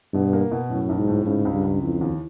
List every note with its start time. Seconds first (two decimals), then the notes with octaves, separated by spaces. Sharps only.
0.13 G2 B2
0.33 A#3
0.51 B2
0.70 F#2 A2
0.89 B1
0.98 G#2
1.08 A2
1.26 G#2 C#3
1.45 C#2
1.54 G2
1.64 C#2
1.83 F2 E3
2.01 D#2